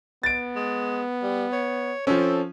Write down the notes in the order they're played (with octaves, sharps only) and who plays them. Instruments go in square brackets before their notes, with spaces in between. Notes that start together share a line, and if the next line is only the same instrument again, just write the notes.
[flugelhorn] B3 [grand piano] A6 D7
[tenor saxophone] G#3
G3
C#5
[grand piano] F3 C#4 [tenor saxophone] C4 [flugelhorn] A4